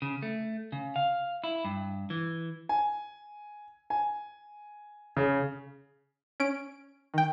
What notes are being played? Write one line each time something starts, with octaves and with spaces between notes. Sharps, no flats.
C#3
A3
C#3
F5
E4
G2
E3
G#5
G#5
C#3
C#4 D7
D#3 G5